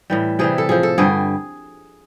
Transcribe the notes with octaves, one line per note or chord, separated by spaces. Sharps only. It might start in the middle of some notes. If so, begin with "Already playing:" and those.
A2 E3 G3
C3 E3 G3 G#4
A4
A2 F3 G#4
A4
G2 D3 G3 G#4